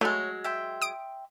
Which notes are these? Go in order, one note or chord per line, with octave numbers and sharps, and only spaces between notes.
F#3 G#3 A3 C#5
E5 G5 C6
D#6 D7